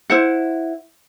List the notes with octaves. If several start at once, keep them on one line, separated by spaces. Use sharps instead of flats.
E4 C5 F#5